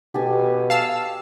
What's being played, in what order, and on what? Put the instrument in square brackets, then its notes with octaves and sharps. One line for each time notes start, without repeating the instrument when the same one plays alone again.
[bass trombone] B2 [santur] G4 A4 G#5
[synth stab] F5 A5 E6